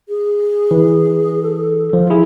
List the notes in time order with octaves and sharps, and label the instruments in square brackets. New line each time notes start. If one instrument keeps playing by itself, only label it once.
[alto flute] G#4
[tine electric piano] E3
[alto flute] A4
[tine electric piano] F3 [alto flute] F4
[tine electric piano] E4 G#4